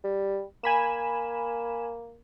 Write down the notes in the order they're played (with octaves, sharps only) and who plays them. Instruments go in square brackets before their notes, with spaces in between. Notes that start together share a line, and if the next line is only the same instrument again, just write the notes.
[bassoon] G3
[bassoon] A#3 [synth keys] G#5 B5 E7